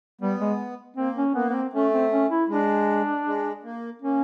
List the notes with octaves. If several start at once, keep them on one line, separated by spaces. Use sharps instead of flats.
G3 B3
G#3
A#3 C4
C#4
A#3 B3
B3
C4
A3 C#4
C4
C#4
E4
G#3 D4
G#3
A#3
A#3 C#4